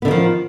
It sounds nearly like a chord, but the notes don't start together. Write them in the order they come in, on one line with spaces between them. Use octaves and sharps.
B3 D3 D#3 F3